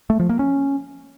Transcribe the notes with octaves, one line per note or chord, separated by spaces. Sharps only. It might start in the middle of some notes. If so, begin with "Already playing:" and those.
A3
F3
A#3
C#4